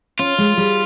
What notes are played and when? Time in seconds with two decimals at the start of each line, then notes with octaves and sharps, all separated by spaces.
0.19 C#4 F4
0.38 G#3
0.57 G3